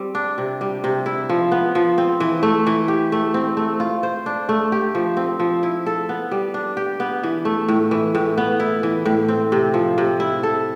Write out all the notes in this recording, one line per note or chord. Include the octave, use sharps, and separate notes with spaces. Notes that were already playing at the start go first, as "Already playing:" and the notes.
Already playing: G3 C4
D4
C3
G3
C3
E4
F3
B3
F3
C4
E3
A3
E3
G4
A3
C4
A3
F4
C5
D4
A3
G4
F3
C4
F3
E4
A4
B3
G3
D4
G4
B3
E3
A3
A2
E3
A2
B3
E4
E3
A2
C4
C3
F3
C3
E4
A4